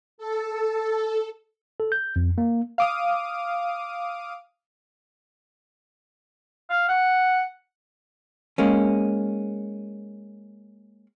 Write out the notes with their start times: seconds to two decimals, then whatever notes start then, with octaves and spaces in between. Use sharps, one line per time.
0.18 A4
1.80 A4
1.92 G6
2.16 F2
2.38 A#3
2.78 F5 D6 D#6
6.70 F5
6.89 F#5
8.58 G#3 A#3 C#4